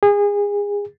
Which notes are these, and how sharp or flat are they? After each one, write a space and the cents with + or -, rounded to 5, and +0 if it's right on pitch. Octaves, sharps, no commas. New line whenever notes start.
G#4 -25